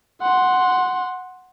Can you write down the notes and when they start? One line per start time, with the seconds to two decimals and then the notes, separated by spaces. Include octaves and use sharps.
0.22 F#5 C6